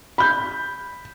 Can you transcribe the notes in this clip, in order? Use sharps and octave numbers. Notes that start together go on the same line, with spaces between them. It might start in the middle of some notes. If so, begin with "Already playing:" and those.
B5 G6